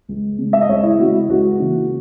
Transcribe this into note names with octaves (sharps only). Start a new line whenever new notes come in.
C#2
C#3 G#3
E5
D#5
C#2 C#5
E4
C#3 G#3 F#4
E4
C#2 F#4
C#3 E3 A#3